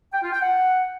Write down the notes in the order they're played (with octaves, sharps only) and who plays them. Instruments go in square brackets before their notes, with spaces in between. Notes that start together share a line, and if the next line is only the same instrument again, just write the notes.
[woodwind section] G5
F4
G5
F#5